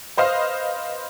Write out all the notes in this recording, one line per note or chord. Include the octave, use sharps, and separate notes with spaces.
B4 C5 D#5 F5